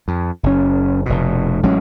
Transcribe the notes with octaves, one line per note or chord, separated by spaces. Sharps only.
F2
F#1 C#4
F1 B2
A1 F#3 G#3 C#4